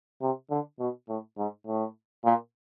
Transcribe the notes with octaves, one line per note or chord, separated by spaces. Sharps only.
C3
D3
B2
A2
G#2
A2
A#2